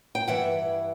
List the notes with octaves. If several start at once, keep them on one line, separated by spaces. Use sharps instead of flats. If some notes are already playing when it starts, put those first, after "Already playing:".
G5
G2 E3 E5 F#5